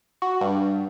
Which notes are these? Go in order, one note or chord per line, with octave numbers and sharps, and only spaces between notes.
F#4
G2